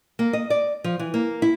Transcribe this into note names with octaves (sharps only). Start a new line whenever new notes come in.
A#3
D#5
D5
F3
E3
A#3
E4